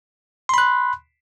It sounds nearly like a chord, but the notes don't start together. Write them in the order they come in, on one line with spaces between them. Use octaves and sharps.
C6 B5 F#6